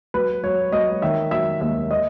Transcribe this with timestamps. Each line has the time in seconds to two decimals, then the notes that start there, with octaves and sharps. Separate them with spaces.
0.14 F#3 B4
0.43 F#3 C#5
0.72 F#3 D#5
1.02 D#3 E5
1.31 F#3 E5
1.61 D#2 E5
1.91 D#5